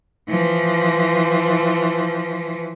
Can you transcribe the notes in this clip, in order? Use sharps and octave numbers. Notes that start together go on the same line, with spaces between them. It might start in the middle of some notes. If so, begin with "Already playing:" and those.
E3 F3